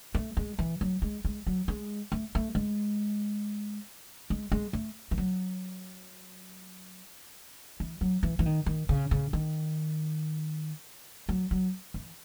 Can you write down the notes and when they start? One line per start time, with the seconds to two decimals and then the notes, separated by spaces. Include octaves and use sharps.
0.14 A3
0.37 G#3
0.59 E3
0.81 F#3
1.02 G#3
1.25 G#3
1.47 F#3
1.68 G#3
2.12 A3
2.35 A3
2.55 G#3
4.30 G#3
4.52 G#3
4.73 A3
5.11 E3
5.18 F#3
7.80 E3
8.01 F#3
8.23 E3
8.39 E3
8.46 D#3
8.66 D#3
8.89 C#3
9.11 C#3
9.33 D#3
11.29 F#3
11.51 F#3
11.94 E3